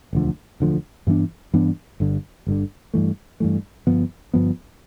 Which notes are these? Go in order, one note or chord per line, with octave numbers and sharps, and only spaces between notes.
E1 D2 D3 F3
E1 D2 D3 F3
G2 E3 B3 D4
G2 E3 B3 D4
G1 G2 D3
G1 G2 D3
G2 E3 A3
G2 E3 A3
G1 G2 F3 B3
G1 G2 F3 B3